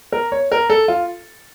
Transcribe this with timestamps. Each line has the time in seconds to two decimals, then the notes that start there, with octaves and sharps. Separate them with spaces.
0.12 A#4
0.32 C#5
0.52 A#4
0.70 A4
0.88 F4